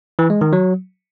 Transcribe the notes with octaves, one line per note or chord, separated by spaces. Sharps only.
E3
G#3
D#3
F#3